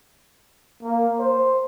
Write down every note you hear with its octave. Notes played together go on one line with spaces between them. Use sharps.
A#3
C5